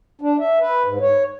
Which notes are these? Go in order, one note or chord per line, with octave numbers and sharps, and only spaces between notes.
D4
E5
B4
G#2
C#5